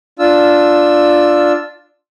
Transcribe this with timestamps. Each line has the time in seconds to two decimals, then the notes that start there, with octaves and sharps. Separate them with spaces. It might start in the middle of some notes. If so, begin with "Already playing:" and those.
0.19 D4 F4 E6